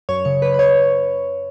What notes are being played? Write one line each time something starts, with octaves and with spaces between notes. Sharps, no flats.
F#2 C#5
C#3 C#5
F#2 B4
B4
C#5